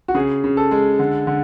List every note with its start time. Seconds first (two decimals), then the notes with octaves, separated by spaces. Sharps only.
0.08 F#4
0.15 C#3 G#4
0.44 C#3
0.57 A4
0.71 G#3
0.99 D3
1.27 D3